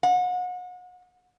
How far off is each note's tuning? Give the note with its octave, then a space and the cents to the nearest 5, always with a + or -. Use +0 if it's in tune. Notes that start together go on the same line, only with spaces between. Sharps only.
F#5 -35